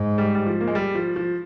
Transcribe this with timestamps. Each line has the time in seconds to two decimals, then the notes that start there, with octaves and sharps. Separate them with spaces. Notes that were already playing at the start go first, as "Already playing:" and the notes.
Already playing: G#2
0.18 G3
0.35 G3
0.46 F3
0.61 A#3
0.67 G#3
0.75 G3
0.95 F3
1.16 F3